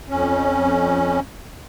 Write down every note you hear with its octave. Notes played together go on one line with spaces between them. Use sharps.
F2 C#4